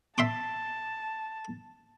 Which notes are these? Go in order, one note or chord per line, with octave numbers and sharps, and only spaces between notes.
E5 A5 C6 D6